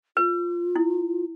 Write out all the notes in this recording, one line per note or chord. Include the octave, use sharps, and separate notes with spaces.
F4 B4
E4